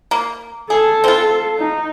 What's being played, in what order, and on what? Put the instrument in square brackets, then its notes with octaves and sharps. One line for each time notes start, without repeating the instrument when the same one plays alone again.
[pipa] A#3
[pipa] G#4 [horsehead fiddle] A4
[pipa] C4 F4
[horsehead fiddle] D#4